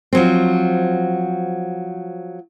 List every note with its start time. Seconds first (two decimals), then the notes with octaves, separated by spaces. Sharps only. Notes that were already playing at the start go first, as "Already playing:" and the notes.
0.13 F3 F#3 C4